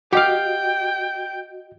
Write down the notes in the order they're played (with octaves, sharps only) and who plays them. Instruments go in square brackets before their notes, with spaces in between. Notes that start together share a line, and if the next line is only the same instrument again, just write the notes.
[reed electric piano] F#4 D#5 [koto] G4 F5 [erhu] G5